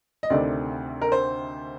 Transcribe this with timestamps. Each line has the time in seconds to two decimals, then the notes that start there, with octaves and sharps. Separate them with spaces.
0.23 D#5
0.30 D2 C3 D#3 A3 C4 D5
1.02 A#4
1.12 C5